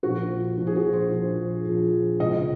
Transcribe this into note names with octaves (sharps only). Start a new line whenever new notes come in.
A#1 A#2 F3 F#4
A#1 A#2 F3
G#4
F#4
C5
A#1 A#2 F3
A#1 A#2 F3
C#2 C3 F3 D#5